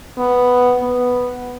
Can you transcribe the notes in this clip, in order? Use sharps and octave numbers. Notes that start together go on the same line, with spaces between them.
B3
B3